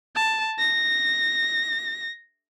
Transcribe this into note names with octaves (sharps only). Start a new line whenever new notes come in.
A5
A#6